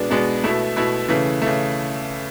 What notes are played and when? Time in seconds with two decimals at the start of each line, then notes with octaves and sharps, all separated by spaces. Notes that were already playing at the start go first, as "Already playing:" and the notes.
Already playing: B2 G#3 B3 D4
0.11 B2 G#3 B3 D4
0.44 B2 A3 E4
0.76 B2 A3 E4
1.08 C#3 E3 A3
1.42 C#3 E3 A3